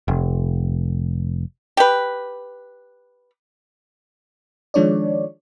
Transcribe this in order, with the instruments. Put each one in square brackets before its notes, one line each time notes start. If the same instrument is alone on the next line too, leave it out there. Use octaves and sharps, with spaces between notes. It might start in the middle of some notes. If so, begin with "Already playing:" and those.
[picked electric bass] F1
[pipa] G4 B4
[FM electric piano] D#3 F3 G#3 D4 C#5 D5